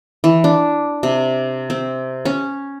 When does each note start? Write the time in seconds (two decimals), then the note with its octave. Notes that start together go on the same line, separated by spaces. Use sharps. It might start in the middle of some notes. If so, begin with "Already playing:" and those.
0.24 E3
0.44 D4
1.03 C3
1.70 C4
2.25 C#4